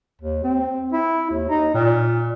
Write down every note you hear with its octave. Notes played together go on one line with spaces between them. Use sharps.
D#2
C4
E4
D#2
D#4
A#2